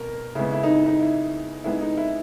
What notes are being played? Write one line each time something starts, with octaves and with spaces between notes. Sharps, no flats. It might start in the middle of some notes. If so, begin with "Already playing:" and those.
Already playing: B2 A#4
C#3 E3 G#3 B3 E4
E4
D#4
D#4
E4
E3 G#3 B3 D#4 E4
D#4
E4